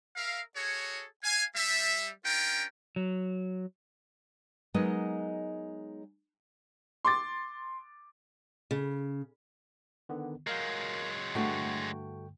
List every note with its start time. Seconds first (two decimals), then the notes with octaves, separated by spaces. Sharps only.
0.16 A#4 E5 F5
0.56 F#4 G#4 A4 C#5
1.23 F5 G#5
1.56 G3 E5
2.25 C#4 D4 F4 A#4 G5
2.96 F#3
4.74 F#3 G#3 B3 D#4 A#4 D#5
7.05 C6 D6 A6
8.71 C#3
10.09 D3 D#3 B3
10.47 F#3 G#3 A#4 F5 G6
11.35 G2 D3 A3 F#4 G5